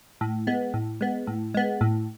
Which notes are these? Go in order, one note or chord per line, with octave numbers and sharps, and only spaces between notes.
A2
G#3 B3
A2
G#3 B3
A2
G#3 B3
A2